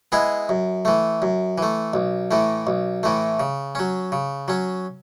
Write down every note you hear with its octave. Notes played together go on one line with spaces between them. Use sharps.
G#3 B3 E4 G#4
F#2
E3 A3
F#2
E3 A3
B1
A2 E3 A3
B1
A2 E3 A3
C#3
F#3 C#4
C#3
F#3 C#4